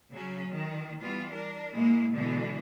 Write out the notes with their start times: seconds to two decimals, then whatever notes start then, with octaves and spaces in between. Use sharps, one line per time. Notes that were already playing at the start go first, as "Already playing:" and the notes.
0.11 C#3 F#3 C#4
0.51 D#3
1.00 E3 G3 B3 F4
1.31 D4 A#4
1.75 A#2 G#3 A#3 E4
2.13 B2 D3 E3 G#3